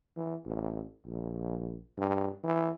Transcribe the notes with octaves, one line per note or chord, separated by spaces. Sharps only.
E3
A1
A#1
G2
E3